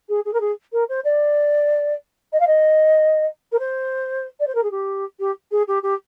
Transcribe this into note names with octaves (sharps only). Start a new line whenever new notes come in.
G#4
G#4
A#4
G#4
A#4
C5
D5
D#5
F5
D#5
A#4
C5
D5
C5
A#4
G#4
G4
G4
G#4
G4
G4